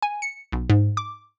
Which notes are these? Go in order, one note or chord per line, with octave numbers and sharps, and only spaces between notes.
G#5
C#7
B1
G#2
D6